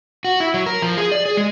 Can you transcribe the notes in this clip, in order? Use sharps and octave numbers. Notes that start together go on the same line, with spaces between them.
F#4
E4
F#3
A#4
F3
G#4
D5
G#4
G#3